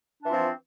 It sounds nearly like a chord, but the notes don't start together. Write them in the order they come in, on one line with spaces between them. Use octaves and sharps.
D4 E3 F4 C4 F3